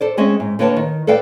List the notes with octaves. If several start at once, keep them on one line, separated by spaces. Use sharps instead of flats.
A4 C5 D5
G#3 C4 C#4 G#4 D#5 E5
G#2
D3 A#3 B4 C#5 G5 A5
D#3
A4 B4 D5 F5 G5